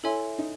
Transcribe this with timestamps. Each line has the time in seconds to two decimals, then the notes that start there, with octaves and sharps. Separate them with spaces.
0.03 E4 A4 C#5 E5 G#5 C6
0.38 D#4